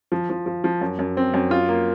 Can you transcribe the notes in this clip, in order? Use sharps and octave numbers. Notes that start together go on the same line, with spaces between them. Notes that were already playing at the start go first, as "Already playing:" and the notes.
F3
F3
F3
F3
F#2
F#2
C4
F#2
F4
A#3